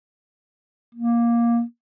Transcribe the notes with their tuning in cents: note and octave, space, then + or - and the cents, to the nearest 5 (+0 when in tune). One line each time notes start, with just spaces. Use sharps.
A#3 +10